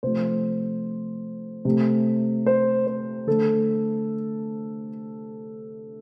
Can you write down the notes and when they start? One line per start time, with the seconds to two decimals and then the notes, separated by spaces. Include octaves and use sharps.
0.03 C3 F3 A3 C5
1.65 C3 A3
2.46 C5
2.87 C5
3.27 D3 A3 A4